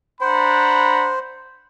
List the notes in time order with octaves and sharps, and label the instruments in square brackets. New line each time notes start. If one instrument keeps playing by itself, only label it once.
[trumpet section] D4 F#5 A#5 [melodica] C5 [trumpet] B5